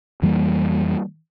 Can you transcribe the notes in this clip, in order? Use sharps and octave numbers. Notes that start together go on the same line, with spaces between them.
F2 E3 G3 A#3